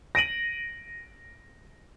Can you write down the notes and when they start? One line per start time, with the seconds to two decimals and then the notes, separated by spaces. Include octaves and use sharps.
0.15 A#6 D7 D#7 F#7